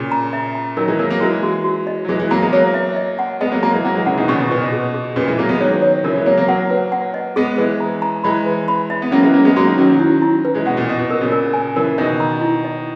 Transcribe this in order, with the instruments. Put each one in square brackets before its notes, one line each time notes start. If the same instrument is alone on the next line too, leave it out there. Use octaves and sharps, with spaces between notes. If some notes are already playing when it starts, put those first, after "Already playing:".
Already playing: [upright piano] A#2 C#3
[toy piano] A#5
E5
A#5
[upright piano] D#3 F#3 [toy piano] A#4
[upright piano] E3 G#3
[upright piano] F#3 A#3 [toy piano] A#4
[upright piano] F#3 A#3
[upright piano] E3 G#3 [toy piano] F#4
[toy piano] F#4
F#4
D#5
[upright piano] F#3
[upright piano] E3 G#3 [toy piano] G#4
[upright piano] E3 G#3
[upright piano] F#3 A#3 [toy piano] A#5
[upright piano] G#3 B3
[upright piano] F#3 A#3 [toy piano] C#5
[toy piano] E5
D#5
F#5
[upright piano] G#3 B3 [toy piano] D#5
[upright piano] F#3 A#3
[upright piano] F#3 A#3 [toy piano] A#5
[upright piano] E3 G#3
[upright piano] F#3 A#3 [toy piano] F#5
[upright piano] E3 G#3
[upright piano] C#3 E3 [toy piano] F#5
[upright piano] B2 D#3
[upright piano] A#2 C#3 [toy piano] C#6
[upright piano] B2
[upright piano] A#2 [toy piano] B4
[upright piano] B2
[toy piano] G#4
G#4
[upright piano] A#2 C#3 [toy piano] B4
[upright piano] E3 G#3
[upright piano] F#3 A#3 [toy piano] G#4
[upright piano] G#3 B3
[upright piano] D#3 F#3 [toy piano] C#5
[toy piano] C#5
[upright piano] C#3 E3 [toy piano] A#4
[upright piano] E3 G#3
[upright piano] F#3 A#3 [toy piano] C#5
[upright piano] F#3 A#3
[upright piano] F#3 A#3 [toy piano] F#5
[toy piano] B4
F#5
D#5
[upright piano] G#3 B3 [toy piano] G#4
[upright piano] E3 G#3 [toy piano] B4
[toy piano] A#5
A#5
[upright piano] E3 G#3 [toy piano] B5
[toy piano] B4
B5
E5
[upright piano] B3
[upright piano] F#3 A#3 [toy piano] C#4
[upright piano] E3 G#3
[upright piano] F#3 A#3 [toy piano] C#4
[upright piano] G#3 B3
[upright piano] F#3 A#3 [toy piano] F#4
[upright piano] D#3 F#3
[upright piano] D#3 F#3 [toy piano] C#4
[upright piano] D#3 F#3
[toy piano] E4
E4
B4
[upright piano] E3 G#3
[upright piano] B2 [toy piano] F#5
[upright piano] A#2
[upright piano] B2 [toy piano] D#5
[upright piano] B2
[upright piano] B2 [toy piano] A#4
[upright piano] A#2 C#3
[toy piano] A#4
G#5
[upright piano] C#3 E3 [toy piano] A#4
[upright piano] B2 D#3 [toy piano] D#5
[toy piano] A#5
E4
D#5